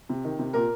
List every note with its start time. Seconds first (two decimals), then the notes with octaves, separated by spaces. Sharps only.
0.09 C3
0.24 D#3
0.39 C3
0.53 A#2 A#4